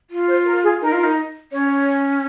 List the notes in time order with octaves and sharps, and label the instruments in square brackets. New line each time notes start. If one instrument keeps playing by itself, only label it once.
[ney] F4
[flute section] C5
A#4
G#4
[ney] D#4 [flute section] A#4
[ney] F4
D#4
[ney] C#4 [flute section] C#5